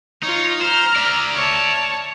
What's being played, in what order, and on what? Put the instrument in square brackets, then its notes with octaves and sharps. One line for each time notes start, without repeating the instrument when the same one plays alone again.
[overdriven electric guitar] D#4 [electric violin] F4 C#5
[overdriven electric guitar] C5 [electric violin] A#5 F6
[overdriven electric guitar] D5 E5
[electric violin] C#5 A5